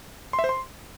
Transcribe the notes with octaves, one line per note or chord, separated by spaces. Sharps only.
C6
E5
C5
C6